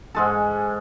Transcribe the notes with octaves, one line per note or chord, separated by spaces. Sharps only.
G#2 G#3 A4